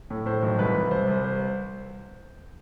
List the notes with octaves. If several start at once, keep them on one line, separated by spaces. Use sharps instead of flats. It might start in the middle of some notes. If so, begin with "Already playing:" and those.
A2
A2 C5
B1
C2 B4
C2
C2 C5
C2
C5